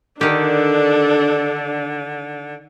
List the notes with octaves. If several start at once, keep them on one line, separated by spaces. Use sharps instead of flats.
D3 D#3 D4 G4 A4